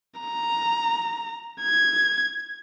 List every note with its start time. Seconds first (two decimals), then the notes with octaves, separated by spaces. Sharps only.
0.20 A#5
1.62 G#6